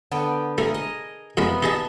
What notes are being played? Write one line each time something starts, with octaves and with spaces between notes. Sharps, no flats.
D3 B3 G5
A3 G#4 A#4
D#5
F2 G#3 B3 A#4 E5
D#4 G#4 D#5 E5 A5